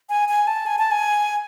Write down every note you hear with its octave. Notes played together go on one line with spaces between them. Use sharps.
G#5
G#5
A5
G#5
A5
G#5